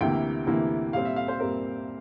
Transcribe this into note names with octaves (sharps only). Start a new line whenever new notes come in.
D2 C3 E3 A#3 E4 G5
D2 C3 E3 A#3 E4
A#2 G3 C4 F5
E5
F5
C5
A#2 G3 C4 A#4